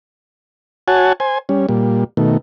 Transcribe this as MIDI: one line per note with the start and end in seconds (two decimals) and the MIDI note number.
0.88 1.13 66
0.88 1.13 73
0.88 1.13 78
0.88 1.13 80
0.88 1.13 81
1.20 1.38 72
1.20 1.38 80
1.49 1.66 55
1.49 1.66 61
1.69 2.04 46
1.69 2.04 55
2.17 2.37 47
2.17 2.37 51
2.17 2.37 57